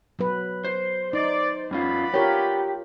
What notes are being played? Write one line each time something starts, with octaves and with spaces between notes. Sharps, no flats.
F#3 B3 B4
C5
D#4 D5
F#2 B3 C#4 F4 D5 B5
F4 G4 A#4 C#5